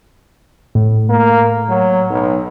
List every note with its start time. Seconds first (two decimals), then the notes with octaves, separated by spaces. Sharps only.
0.75 A2
1.10 A#3
1.69 F#3
2.11 B1